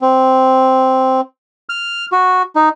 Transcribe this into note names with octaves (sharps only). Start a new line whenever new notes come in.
C4
F6
F#4
D#4